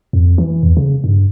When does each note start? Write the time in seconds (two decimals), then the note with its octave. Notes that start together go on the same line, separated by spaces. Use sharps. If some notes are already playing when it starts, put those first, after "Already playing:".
0.13 F2
0.38 E3
0.63 E2
0.77 C#3
1.04 G2